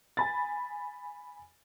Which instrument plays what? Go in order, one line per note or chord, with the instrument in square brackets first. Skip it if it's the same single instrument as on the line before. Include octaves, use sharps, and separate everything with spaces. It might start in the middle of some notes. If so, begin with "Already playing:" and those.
[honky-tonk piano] G#5 B5 A6